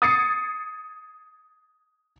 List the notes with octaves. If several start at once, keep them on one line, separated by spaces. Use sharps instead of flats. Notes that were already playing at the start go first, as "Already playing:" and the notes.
D#6 G#6 A6 C7 C#7